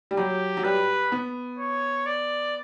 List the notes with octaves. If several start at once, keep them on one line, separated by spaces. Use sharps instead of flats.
G3
F#3 G4
F#3
G3 B4
B3
C#5
D5